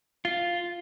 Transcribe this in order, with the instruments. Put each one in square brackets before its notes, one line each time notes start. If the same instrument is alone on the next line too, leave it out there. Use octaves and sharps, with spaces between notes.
[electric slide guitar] F4